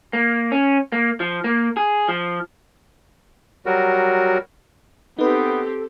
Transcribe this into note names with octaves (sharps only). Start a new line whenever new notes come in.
A#3
C#4
A#3
F3
A#3
G#4
F3
F#3 G3 F#4 A#4
B3 C4 D#4 G4 A4 B4